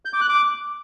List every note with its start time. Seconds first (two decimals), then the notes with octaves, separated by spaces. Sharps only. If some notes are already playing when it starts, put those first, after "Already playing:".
0.05 G6
0.13 D6
0.21 F#6
0.29 D6